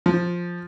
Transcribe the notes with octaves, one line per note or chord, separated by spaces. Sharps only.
F3